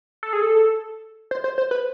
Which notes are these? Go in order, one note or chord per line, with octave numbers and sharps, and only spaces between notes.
A4
G#4
A4
C5
C5
C5
B4